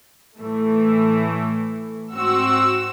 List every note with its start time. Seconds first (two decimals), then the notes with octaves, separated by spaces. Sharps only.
0.38 A2 E3 A3
2.15 G#2 C4 F#4 E6